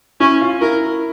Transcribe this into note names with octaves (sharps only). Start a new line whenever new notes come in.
C#4 E4
F4
E4 A#4